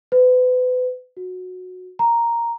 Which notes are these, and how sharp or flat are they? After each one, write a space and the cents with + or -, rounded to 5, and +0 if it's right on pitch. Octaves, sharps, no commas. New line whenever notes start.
B4 +35
F#4 -15
A#5 +0